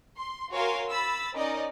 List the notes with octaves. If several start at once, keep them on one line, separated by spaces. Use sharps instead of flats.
C6
F#4 A#4 C#5 F5 G#5 C6
B5 E6 A6
C#4 D#4 A#4 D5 D#5